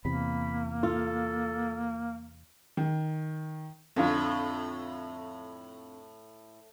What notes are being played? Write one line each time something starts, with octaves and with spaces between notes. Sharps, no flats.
E2 C3 A#3 B5
F4 A4
D#3
F2 A2 D3 F4